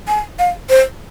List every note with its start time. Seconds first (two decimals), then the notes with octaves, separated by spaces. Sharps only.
0.07 G#5
0.39 F5
0.69 C5